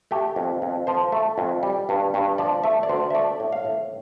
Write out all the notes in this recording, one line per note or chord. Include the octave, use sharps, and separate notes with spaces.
A3 G4
F2
F2
F3 C5
A3
F2
G3
G2
G2
F3 D5
A3 E5
D5
D2 C5
E5
A3 D5
A2
F5
A2